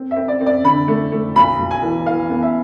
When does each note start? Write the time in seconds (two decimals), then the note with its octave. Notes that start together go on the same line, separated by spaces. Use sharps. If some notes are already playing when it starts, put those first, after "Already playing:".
Already playing: C4
0.11 E5
0.16 C4
0.28 D5
0.41 C4
0.46 D5
0.64 D3 B5
0.88 A3
1.12 A3
1.35 B1 B5
1.59 B1
1.71 G#5
1.82 E3
2.06 E3 F5
2.30 B3
2.43 E5